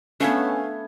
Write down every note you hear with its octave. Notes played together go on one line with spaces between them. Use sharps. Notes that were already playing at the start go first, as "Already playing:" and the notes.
A3 B3 C#4 D4 B4 F5 G#6